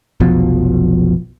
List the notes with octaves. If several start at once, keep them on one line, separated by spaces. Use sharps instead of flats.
F1 B1 B2 F3